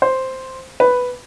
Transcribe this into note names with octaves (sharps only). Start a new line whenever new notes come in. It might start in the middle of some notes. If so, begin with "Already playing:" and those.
C5
B4